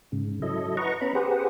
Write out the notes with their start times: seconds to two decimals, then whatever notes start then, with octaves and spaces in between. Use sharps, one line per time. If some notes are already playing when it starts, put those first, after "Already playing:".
0.12 G#2 C#3
0.42 F#3 E4 A4 D#5
0.77 B4 D#5 F#5 A#5 C#6
1.01 B3 C#4 A#5 B5
1.15 G4 G#4 B4 C5 F#5